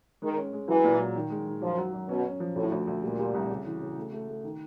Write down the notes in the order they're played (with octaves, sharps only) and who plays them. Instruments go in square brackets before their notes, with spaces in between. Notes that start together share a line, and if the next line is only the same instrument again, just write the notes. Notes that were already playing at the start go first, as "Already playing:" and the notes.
[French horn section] D#3 [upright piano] G#3
[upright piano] C#4
G#3
[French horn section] E3 [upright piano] F#3
[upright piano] A#2
F#3
D#3
G#3
D#3
[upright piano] F#2 [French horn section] F3
[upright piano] F#3
F#2
[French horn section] B2 [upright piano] C#4
[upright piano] C#4
F3
[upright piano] D2 [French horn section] A2
[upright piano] D2
D2
[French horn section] A#2 [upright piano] G3
[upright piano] G3
C2
C#3
E3
C#3
A3
A3
A3
D#3